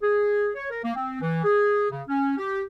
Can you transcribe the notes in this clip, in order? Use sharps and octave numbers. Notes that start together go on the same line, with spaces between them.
G#4
C#5
A#4
A#3
C4
E3
G#4
C#3
C#4
G4